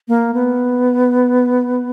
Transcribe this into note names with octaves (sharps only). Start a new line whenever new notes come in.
A#3
B3